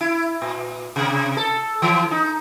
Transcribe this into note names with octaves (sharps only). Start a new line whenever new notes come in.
E4
A#2
C3
A4
E3
D#4